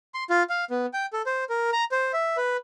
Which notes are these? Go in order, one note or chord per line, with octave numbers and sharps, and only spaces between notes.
C6
F4
F5
B3
G5
A4
C5
A#4
A#5
C5
E5
B4